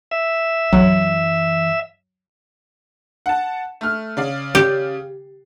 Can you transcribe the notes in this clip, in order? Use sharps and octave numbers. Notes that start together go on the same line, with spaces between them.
E5
F#2 E3 F#3
F#5 A5
A3 F6
C#3 D5 F5
G4